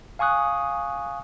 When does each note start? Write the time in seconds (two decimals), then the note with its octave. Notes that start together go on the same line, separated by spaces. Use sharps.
0.19 F5 G#5 C#6 D#6 F#6